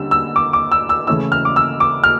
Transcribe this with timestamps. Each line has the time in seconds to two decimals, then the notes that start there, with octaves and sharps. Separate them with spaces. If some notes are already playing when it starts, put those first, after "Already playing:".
Already playing: D3 G3 A#3 C#4 E6
0.11 E6
0.36 D6
0.53 D6
0.72 E6
0.89 E6
1.07 C#3 E3 A3 C#4 E4 E6
1.32 F6
1.45 D6
1.56 E6
1.80 D6
2.04 F6